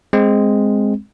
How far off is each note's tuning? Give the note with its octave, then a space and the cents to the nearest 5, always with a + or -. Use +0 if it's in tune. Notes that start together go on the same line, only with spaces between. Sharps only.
G#3 +0 C4 +0